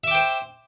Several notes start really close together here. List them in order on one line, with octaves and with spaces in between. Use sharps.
E5 D6 G5 C5